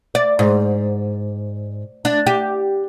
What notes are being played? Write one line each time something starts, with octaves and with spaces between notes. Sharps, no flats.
D5
G#2
D4
G4